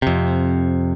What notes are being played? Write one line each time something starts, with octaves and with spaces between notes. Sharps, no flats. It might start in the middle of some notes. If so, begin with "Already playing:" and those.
F2 C3